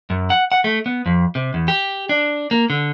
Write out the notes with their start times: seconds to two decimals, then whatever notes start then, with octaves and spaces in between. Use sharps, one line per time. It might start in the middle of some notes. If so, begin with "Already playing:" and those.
0.10 F#2
0.30 F#5
0.52 F#5
0.64 A3
0.86 B3
1.06 F2
1.35 C3
1.54 E2
1.68 G4
2.09 D4
2.51 A#3
2.70 D3